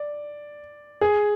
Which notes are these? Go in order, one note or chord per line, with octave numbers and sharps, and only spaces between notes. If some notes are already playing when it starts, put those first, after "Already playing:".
Already playing: D5
G#4